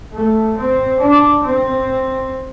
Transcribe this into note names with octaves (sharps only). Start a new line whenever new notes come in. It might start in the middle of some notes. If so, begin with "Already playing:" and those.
A3
C4
D4
C4